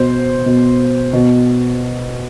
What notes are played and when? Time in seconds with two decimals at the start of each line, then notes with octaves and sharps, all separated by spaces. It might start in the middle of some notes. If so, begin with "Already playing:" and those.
Already playing: B2 C5
0.46 B2
1.13 B2